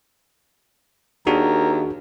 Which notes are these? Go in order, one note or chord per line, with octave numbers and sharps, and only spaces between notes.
D#2 D4 F#4 G#4 A#4